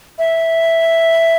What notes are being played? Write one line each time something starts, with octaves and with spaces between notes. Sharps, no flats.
E5